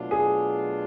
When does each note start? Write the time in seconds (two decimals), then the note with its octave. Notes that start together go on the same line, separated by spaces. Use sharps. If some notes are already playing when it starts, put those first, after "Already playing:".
Already playing: B2 F#3 A3 D4 F4
0.11 G#4